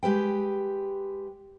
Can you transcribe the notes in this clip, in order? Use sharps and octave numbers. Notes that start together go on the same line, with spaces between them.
G#3 G4 B4 G5